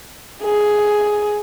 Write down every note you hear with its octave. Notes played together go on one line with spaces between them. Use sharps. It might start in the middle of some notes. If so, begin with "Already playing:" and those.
G#4